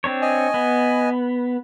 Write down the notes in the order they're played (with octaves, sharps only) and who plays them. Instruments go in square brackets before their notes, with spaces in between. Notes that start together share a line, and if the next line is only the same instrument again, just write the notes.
[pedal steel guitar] C4 D4 C#5
[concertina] D#5 G#5
[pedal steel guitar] B3